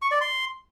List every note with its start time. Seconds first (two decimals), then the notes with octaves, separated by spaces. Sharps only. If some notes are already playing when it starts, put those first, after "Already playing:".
0.02 C#6
0.11 D5
0.21 C6